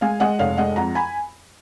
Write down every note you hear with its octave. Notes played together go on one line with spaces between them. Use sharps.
G#3 F5 G#5
G#3 D#5 F#5
F1 C#5 F5
G#3 D#5 F#5
F2 F#5 A#5
G#5 B5